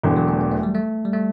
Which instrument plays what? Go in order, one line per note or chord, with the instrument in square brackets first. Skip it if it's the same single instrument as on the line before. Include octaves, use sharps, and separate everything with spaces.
[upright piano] E1 E2 D3 [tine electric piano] E3
[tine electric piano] F#3
A3
B3
A3
G3
A3
G3
A3